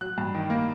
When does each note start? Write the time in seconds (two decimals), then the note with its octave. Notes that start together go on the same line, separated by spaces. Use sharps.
0.01 F#3 F#6
0.18 G2
0.34 D#3
0.50 A#3